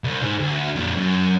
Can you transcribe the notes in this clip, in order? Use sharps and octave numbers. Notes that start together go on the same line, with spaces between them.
C2
G#2
D2
F2 A#2
F#2